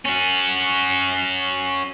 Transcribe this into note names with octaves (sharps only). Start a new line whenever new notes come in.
C#4 F#4